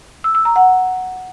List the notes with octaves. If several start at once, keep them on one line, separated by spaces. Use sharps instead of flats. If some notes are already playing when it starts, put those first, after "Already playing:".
E6
E6
A#5
F#5